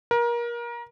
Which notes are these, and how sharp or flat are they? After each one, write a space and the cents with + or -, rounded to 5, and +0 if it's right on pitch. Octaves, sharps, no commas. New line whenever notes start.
A#4 +25